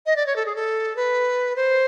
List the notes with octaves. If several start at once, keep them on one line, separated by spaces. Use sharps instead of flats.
D#5
D5
C#5
A4
G#4
A4
B4
C5